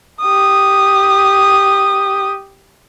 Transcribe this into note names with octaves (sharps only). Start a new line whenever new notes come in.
G4 D#6